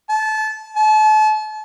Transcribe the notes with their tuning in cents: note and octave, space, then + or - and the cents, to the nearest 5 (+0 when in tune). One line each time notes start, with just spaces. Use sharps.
A5 -25
A5 -35